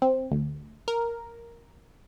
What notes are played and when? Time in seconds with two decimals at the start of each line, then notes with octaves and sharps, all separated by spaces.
0.02 C4
0.31 D2
0.88 A#4